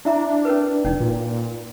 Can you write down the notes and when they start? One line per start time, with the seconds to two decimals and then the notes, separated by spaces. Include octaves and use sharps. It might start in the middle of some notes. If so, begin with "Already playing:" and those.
0.05 D4 E4 E5 A#5
0.45 C#4 A#4 B4
0.85 E1 C#4 D#4
1.00 A#2